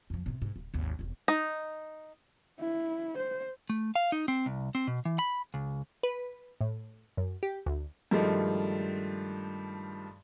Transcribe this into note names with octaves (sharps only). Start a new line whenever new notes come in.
F2 F3
A2 C3
G#2
D1
G#1 D#2
F1 E2
D#4
E4
C5
A3
F5
D#4
C4
C2
C4
B2
E3
B5
C#2
B4
A2
F#2
G4
D2
G2 D#3 F3 G#3 A3